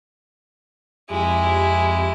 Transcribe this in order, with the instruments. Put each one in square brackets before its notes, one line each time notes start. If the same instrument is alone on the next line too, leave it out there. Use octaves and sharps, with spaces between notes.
[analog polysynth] F2 G4 [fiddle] G#3 E4